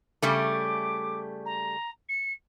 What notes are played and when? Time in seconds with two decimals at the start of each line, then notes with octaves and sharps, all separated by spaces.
0.22 C#3 G3 A3 D6
1.45 A#5
2.09 C#7